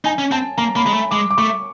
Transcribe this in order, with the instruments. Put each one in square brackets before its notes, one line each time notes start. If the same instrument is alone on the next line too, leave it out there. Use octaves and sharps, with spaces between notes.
[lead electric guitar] D#4 [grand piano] G#5
[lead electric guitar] C#4
[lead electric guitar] C4 [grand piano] A5
[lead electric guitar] A#3 [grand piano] A#5
[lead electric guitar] A#3 [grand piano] B5
[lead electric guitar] G#3
A3
[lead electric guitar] G#3 [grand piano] D6
[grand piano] D6
[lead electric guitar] A3 [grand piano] C#6